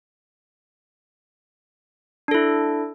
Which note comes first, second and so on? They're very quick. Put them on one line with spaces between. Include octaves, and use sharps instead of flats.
D4 A4 E4